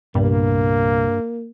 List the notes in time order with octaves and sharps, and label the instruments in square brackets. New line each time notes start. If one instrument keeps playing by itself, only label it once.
[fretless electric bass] C2 A#2 B3 [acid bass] G2 [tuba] A#3